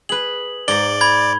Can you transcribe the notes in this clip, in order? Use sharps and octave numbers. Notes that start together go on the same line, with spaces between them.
G#4 B4 F#7
G#2 D5 A#5 G7
B5 G#6